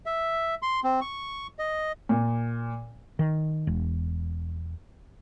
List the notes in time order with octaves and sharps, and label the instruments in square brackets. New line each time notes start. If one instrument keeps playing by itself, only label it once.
[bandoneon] E5
C6
C4
C#6
D#5
[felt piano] A#2
[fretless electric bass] D#3
E1